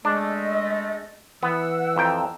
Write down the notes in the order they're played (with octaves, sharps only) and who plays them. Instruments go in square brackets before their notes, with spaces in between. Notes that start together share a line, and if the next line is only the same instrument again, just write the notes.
[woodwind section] G#3 A3 [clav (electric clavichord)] D4 [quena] D#5
[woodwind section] E3 E6 [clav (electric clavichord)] B3 [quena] F#5
[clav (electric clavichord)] F2 G5 [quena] A#5